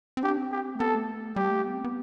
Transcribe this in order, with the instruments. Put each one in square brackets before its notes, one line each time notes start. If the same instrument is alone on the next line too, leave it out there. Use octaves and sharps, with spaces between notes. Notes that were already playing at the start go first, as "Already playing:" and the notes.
[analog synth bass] C4
[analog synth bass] D4 [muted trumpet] G4
[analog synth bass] C4
[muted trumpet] G4
[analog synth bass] A3
[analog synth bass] B3 [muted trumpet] A4
[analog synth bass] A3
[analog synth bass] G3 [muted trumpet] G4
[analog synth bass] A3
B3
C4
B3